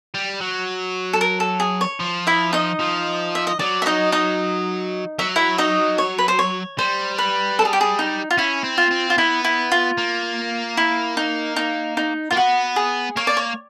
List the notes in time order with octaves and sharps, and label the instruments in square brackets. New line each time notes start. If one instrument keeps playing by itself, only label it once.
[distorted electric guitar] G3
F#3
[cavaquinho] A4
A#4
A4
G#4
C#5
[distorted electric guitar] F3
[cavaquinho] E4 E5
D#4 D#5
[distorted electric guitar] F3
[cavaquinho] E5
D#5
[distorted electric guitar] F#3 [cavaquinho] D5
[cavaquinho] E5
D#4 D#5
D#4 D#5
[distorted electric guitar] F#3 [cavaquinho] E5
[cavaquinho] E4 E5
D#4 D#5
C#5
B4
C5
C#5
[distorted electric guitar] G3 [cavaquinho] C5
[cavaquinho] B4
A4
G#4
G4
G#4
D#4
F4
[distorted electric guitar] C#4 [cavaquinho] E4
[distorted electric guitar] C4
[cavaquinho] F4
[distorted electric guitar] C4
[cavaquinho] F4
[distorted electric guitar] B3 [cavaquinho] E4
[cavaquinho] E4
F4
[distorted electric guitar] A#3
[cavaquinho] E4
D#4
D#4
D#4
[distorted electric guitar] A#3 [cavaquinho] F4
[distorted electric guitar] B3 [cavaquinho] F#4
[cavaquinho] G#4
[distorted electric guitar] A#3 [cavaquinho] C#5
[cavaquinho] D5
C#5